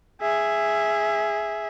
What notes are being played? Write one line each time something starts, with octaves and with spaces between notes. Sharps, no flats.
G#4 E5